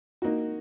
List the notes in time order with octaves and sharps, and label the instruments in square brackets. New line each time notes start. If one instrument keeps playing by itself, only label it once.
[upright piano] A#3 D#4 F#4